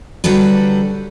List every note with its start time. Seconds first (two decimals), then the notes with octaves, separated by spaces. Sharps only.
0.24 D3 F#3 G3 A4 B4